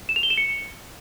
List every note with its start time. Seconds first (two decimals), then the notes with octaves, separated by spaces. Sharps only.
0.09 E7
0.16 F7
0.23 G7
0.30 E7
0.37 C#7